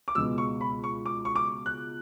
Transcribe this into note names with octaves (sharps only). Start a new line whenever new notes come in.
D6
C#2 B2 G#3 B3 E6
C#6
B5
C#6
D6
C#6
D6
F#6